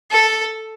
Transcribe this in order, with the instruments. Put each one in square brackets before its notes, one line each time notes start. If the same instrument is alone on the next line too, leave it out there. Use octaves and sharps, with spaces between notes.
[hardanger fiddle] A4